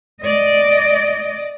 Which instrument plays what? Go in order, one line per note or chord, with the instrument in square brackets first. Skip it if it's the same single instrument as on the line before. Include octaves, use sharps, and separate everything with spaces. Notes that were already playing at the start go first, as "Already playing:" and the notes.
[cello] D5 D#5